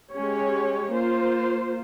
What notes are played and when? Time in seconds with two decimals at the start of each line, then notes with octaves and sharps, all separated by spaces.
0.12 G#3 C#4 G4 C#5
0.92 A#3 F4 C5